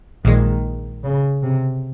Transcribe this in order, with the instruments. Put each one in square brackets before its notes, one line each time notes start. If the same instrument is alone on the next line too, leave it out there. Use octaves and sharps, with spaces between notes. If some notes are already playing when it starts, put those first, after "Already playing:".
[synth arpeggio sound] A#1 A#2 G#3 [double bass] D#3
[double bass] C#3
C3